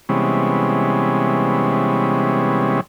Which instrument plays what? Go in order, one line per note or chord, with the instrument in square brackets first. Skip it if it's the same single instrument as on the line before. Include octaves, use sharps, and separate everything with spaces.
[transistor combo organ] C3 E3 G3 G#3 B3 C#4